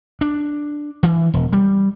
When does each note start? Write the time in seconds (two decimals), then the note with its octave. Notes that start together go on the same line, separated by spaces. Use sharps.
0.21 D4
1.03 E3
1.34 E1
1.53 G3